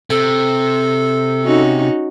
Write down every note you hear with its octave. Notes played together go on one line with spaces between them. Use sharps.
C3 A4
C#4 D#4 F#4